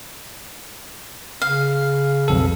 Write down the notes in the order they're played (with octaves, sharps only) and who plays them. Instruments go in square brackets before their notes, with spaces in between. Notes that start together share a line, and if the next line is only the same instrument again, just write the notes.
[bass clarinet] C#3 [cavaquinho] F5
[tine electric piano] B1 F2 A4